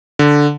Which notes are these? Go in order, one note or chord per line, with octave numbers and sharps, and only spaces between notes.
D3